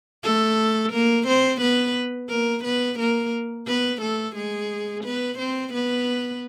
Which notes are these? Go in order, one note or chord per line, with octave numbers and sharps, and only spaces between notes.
A3 A4
A#3 A#4
C4 C5
B3 B4
A#3 A#4
B3 B4
A#3 A#4
B3 B4
A3 A4
G#3 G#4
B3 B4
C4 C5
B3 B4